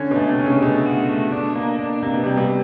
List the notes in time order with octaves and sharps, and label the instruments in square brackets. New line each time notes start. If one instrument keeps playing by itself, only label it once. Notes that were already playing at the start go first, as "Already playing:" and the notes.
Already playing: [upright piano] D3 [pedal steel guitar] C#4
[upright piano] B2 [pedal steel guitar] A3
[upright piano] C3
[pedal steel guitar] C#4
[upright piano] C#3
[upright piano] B2 [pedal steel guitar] A3
[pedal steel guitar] F#4
A3
D4
A#3
D4
[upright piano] C3 [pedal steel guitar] A#3
[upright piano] B2
[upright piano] C3 [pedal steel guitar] G3
[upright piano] B2